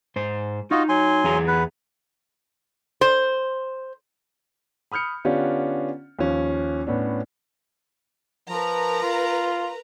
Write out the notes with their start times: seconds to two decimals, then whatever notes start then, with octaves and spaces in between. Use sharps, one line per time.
0.16 G#2 C5
0.71 D#4 F4 F#4 D#5
0.89 F#3 G#5 C6
1.24 E2 G#4 A#5
1.48 B4 F#5
3.01 C5
4.92 B5 D#6 F6 G6 C#7
5.25 D3 B3 C#4 D4 F4 G4
6.19 D#2 F3 C#4
6.87 A2 B3 C#4 D4
8.49 F3 A#4 B4 A#5
9.02 F4